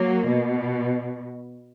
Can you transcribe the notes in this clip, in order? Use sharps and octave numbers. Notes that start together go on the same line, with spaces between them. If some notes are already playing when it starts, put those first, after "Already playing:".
Already playing: F#3 A#3
B2